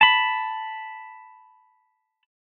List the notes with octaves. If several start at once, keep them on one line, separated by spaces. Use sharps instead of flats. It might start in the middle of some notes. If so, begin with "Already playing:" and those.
A5 B5